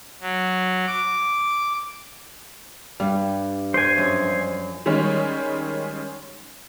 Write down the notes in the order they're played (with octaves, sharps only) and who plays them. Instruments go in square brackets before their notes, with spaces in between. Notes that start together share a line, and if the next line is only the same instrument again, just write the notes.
[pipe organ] F#3
D6
[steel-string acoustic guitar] G2 [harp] G3
[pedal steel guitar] C5 G#5
[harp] F#2 F3
[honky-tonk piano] D#3 G3 G#3 C#4